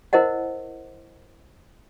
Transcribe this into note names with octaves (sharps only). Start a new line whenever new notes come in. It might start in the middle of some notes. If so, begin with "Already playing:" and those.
E4 A#4 C5 D#5 F#5